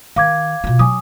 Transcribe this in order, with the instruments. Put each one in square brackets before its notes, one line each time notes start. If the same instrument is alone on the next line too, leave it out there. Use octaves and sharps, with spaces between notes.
[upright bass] D#3 [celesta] F5 D6 G#6
[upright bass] B2 F4
[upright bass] F#3 [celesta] G#5 D6 D#6